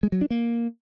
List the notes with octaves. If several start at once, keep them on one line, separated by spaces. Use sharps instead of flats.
G#3
F#3
D4
A#3